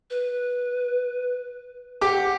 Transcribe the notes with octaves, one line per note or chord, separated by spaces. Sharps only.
B4
G4 F#5 D6